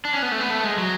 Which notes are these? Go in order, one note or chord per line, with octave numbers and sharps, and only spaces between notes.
D4
C#4
B3
A3
B3
A3
G#3
F#3